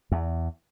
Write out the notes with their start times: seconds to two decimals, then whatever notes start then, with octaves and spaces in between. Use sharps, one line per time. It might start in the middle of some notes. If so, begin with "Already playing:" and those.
0.12 E2